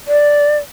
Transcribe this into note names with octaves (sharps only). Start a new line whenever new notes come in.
D5